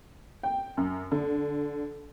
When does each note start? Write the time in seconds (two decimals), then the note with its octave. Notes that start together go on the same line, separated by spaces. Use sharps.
0.43 G5
0.77 F#2
1.12 D3